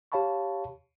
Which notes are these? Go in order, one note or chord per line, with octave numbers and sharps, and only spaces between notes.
G4 C#5 F5 A5 B5 C#6